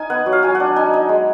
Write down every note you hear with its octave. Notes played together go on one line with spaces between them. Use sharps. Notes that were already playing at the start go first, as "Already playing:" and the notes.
Already playing: D#4 G#5
B3 F#5
F#3
F5
F#3 G#5
F#5
D4
D#4 G#5
D#4
G#3